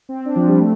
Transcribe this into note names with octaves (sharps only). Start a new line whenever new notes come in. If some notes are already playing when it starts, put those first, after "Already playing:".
C4
D4
F3
G3
A3